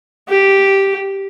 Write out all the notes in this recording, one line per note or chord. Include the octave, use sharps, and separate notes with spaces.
G4